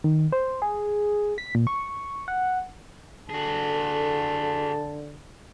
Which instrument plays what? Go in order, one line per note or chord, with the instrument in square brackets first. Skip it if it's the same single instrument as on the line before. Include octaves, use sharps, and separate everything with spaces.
[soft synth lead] D#3
C5
G#4
B6
A#2
C#6
F#5
[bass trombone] D3 [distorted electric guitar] F#4 G#4 [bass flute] A4 [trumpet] A5